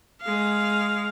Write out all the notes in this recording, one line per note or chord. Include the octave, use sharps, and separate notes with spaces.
G#3 F5